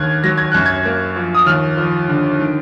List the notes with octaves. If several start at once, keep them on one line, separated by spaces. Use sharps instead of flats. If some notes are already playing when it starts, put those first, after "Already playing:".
Already playing: D#2 D#3 F6 F#6 G#6
F#3 A#6
G#6
F#2 F#6
G#6
A#3
F3
D#6
D#2 F6
F3
D3
D#3